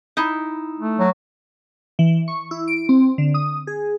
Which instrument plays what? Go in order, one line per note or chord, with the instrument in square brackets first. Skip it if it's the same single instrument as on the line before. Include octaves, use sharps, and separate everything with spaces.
[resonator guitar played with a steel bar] D#4 E4
[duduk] A3
[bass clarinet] F#3
[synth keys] E3
C#6
E4
D7
C4
D3
D#6
G#4